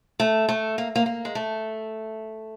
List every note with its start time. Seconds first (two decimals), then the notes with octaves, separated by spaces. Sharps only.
0.20 A3
0.49 A3
0.78 A#3
0.96 A#3
1.06 A#3
1.25 G#3
1.35 A3